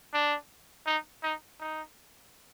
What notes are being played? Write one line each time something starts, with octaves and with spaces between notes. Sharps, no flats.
D4
D#4
D#4
D#4